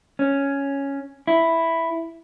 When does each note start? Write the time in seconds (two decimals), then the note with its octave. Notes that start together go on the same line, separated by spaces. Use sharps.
0.19 C#4
1.27 E4